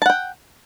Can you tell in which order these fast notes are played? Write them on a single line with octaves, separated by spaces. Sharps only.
A5 F#5 G5